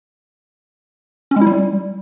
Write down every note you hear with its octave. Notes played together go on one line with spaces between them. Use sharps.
C#4
G#3
E4
G3